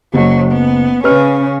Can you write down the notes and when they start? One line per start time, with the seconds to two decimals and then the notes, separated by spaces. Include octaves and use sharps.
0.14 F#1 F#3
0.52 B3
1.04 C#3 C#4 B4 F6